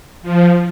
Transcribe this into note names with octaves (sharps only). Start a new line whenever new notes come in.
F3